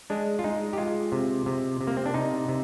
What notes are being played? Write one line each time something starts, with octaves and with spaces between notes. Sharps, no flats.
G#3 D4
F4
G#3 D#4
G4
G#3 F4
C3
C3
C3
A#3
C4
D4
C3 D#4
C3